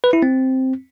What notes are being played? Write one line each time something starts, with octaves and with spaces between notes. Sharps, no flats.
B4
E4
C4